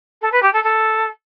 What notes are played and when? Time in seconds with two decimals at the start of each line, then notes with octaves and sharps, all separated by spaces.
0.21 A4
0.32 B4
0.42 G4
0.53 A4
0.63 A4